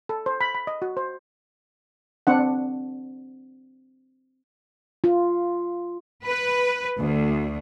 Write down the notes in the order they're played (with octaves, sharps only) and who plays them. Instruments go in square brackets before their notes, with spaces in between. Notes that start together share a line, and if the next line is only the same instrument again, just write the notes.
[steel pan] A4
C5
B5
B5
D#5
F#4
C5
C4 D4 F#5
[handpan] F4
[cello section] B4
D2